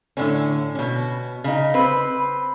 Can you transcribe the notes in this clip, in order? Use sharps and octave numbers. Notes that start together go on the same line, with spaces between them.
A2 D3 C#4
B2 C#4
C#3 D#4
C4 B4